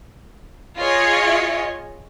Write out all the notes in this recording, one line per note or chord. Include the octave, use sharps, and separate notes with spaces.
F4 G#4 C#5 D#5